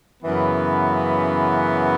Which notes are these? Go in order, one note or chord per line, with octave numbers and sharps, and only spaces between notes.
F#2 C#3 E3 B3